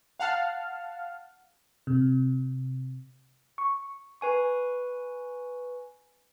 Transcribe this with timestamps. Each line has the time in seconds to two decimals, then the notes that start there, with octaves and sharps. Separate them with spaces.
0.20 F5 F#5 A5 F6
1.87 C3
3.58 C#6
4.21 B4 G#5 C#6